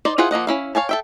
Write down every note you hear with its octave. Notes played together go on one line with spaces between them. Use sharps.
D#4 C5 D5
E4 F4 G#4 C5 F#5
F3 A#3 D#5 F#5
C#4 E4 F5
C#5 F5 G#5 A5
A4 E5 G5